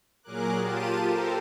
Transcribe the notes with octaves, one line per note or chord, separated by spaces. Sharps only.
A#2 F#3 G#4 A#4 D6 F#6
F4 G4 A5 D#7
G4 A4 A#4 C5